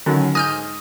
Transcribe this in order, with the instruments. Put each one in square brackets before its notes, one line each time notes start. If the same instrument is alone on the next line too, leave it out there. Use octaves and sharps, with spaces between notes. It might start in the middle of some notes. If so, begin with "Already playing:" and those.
[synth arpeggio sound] D3 [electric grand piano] D#3 F#3 C#4
[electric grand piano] G#2 D#6 A#6 [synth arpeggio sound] G#5 F6 G6